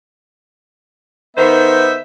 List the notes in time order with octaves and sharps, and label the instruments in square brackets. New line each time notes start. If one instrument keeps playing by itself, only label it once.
[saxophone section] D#3 C5 [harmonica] B3 E5